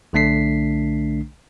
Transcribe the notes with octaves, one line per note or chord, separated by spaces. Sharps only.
B1 D3 A3 D4 B6 C7